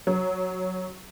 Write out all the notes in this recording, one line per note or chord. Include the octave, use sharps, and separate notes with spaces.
F#3